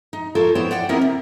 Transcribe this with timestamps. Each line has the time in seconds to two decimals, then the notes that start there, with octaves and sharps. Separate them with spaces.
0.13 D#4
0.35 F4 A4 A#4 C5 C#5
0.55 B3 E4 C5 C#5 G5
0.71 D5 F#5 G5
0.89 B3 C4 D#4 E4 G#4 A#4
1.01 C3